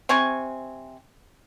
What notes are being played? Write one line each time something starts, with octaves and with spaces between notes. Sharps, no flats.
C3 C4 G#5 C#6